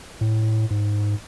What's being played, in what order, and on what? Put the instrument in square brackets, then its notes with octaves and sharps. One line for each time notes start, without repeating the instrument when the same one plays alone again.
[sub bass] A2
G#2